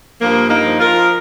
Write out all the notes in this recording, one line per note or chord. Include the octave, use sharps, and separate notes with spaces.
G2 F3 A#3
A#3 D#4
F3
F4 A#4